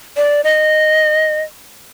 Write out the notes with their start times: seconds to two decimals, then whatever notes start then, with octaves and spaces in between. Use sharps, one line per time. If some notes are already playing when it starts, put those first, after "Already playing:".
0.17 D5
0.44 D#5